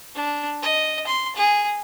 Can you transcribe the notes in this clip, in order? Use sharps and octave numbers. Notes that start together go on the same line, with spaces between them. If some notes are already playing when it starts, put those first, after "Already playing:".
D4
D#5
C6
G#4